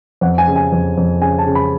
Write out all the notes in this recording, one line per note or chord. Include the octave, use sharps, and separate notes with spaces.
F2 F#5
G#5
C#3
G#5
F2
F2
C#3 G#5
A5
C#3
B5